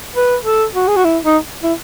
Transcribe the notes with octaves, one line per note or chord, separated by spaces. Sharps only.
B4
A4
F#4
G#4
F#4
E4
D#4
E4